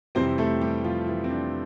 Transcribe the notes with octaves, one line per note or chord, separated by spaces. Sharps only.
F2 C3 E3 G3 C4 C5
A3 A4
G3 G4
F3 F4
E3 E4
C4
D4